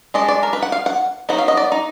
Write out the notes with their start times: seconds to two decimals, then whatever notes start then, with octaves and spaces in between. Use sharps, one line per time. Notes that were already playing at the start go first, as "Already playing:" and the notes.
0.14 G#3 D4 D#5
0.28 D5
0.43 A#4
0.53 B4
0.62 F#5
0.72 F5
0.86 F#5
1.29 F#3 B3 D#4 F#5
1.38 F5
1.48 D#5
1.57 D5
1.72 D#4